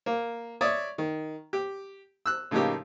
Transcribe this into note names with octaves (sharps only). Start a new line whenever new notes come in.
A#3
C#5 D5 E5 D#6
D#3
G4
E6 F#6
A2 C#3 F3 A#3 D#4 G4